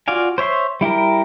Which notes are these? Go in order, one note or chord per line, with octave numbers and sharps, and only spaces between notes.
F4 F#4 D5 F5 G#5
C5 C#5 E5 C6
G3 E4 G4 A#4